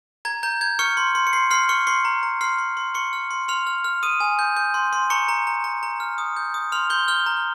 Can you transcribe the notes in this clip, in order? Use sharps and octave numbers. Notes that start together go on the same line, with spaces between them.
A#5 G#6
A#5 G6
G6 G#6
C#6 F6 C#7
C6
C6
C#7
C6 C7
C6 F6 C7
C#6 F6 C#7
C6 C#6 C7
A#5
A#5
C6 F6 C7
C6
C6
C6 C#6 C#7
F6
C6
C6 F6 F7
F6
F6
D#6 D#7
G#5
G6
G6
C6
C6
A#5 C#6 C#7
A#5
A#5
A#5
A#5
F6
D#6
G6
D#6
C6 F6 F7
C6 G6 G7
F6 G6 G7
A#5